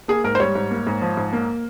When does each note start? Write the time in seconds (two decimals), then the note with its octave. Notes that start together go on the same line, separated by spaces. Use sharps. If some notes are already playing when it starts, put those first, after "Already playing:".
0.08 A#3 G#4
0.24 G#2 A#4
0.35 C5
0.40 G3 C#5
0.55 G#2
0.71 A#3
0.87 G#2
1.02 F3
1.17 G#2
1.33 A#3